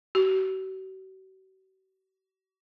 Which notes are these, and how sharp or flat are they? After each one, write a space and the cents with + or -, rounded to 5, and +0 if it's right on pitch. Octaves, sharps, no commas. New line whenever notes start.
F#4 +45